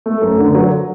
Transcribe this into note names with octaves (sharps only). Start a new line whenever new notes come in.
A3
F#2
D3
F#3